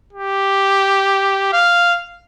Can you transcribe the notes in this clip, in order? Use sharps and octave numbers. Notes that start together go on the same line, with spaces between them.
G4
F5